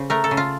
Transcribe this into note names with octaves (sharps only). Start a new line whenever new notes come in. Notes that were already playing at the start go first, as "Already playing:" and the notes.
Already playing: C#3 C5
A3 A#4
A4
C#3
F4